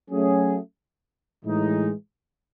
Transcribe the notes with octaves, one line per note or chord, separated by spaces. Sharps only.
F#3 A3 C#4 G#4
A2 E3 G#3 D#4